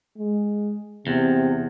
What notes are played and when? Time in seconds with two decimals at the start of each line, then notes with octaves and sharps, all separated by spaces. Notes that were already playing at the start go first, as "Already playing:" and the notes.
0.17 G#3
1.07 E2 C3